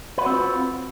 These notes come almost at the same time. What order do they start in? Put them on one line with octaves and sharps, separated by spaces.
B4 F#4 C4 F4